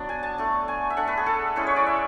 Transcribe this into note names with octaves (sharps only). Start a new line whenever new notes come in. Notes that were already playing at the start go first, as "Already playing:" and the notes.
Already playing: F#3 B3 D4
G#5
A5
A3 D4
G#5
E5
A3 D4 F#5
B4
G#4
A4
G#3 C#4 E4 B4
C#5
D5
E5